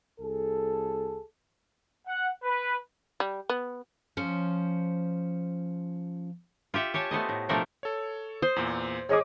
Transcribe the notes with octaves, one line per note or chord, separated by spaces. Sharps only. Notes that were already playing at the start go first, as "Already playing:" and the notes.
C2 G#4 A4
F#5
B4
G3
B3
F3 C#4 C5
F4 G4 E5 F#5
G4 C#5 G#5 A5
A3 B3 C5 D#5
A2
B2 F3 A3 D4 A#4 G5
A4 C#5
C5 D#6
E2 A#2
G#4 C#5 D#5 D6